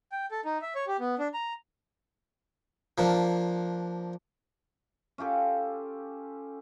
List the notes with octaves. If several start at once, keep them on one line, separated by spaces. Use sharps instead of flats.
G5
A4
D#4
E5
C#5
G4
B3
D4
A#5
F3 A#3 D4
C#4 F4 G4 A4